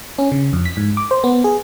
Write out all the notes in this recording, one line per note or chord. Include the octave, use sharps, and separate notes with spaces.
C#4
C#3
F2
B6
G#2
D6
C5
B3
G#4